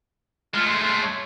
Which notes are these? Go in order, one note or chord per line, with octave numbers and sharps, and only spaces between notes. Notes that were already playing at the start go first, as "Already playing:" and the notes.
G#3 A3 F4
C6
C#5